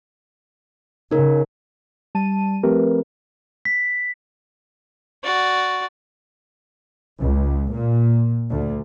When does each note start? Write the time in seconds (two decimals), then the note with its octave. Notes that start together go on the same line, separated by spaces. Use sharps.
1.11 C#3 D#4 A#4
2.15 G3 A5 D#7
2.63 F3 A3 C4 G4 A#4 B4
3.65 B6
5.23 F#4 D5
7.19 C#2
7.71 A#2
8.49 D2